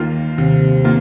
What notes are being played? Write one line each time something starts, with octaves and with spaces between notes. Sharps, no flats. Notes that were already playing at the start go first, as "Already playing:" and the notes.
Already playing: D#2 D#3 A#3 F4
D#2 C3
D#3 A#3 F4